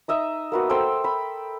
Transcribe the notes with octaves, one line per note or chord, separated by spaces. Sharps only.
D#4 D#5 E5
A#3 B3 F#4
A4 C5 G5 E6
B5